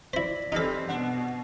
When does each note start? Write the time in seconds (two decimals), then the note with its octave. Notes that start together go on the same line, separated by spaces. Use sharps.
0.13 E4 C5 D5 A#6 B6
0.52 E3 G3 C4 D#4 A4
0.89 B2 D4 F#5